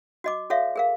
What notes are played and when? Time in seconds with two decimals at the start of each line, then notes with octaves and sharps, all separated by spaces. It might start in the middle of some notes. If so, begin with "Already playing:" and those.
0.24 F#4 D#5 D6
0.50 F#4 A4 C#5 E5 F5
0.76 G#4 A#4 F5